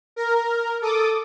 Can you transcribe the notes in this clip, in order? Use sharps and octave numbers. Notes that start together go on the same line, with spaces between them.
A#4
A4 D6 D#6